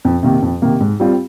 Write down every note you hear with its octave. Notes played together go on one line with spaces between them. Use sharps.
F2
C3 D#3 A#3
F2
C3 D#3 A#3
G#2
G3 C4 F4